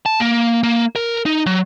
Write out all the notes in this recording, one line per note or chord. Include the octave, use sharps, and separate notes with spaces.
A5
A#3
A#3
A#4
D#4
F#3